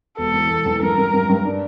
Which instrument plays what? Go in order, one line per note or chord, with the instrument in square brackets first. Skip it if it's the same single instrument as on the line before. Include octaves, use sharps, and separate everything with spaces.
[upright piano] E1 [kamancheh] A4
[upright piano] E2
E1
E2
[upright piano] G2 [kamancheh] A#4
[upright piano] G2
G2
G2
D4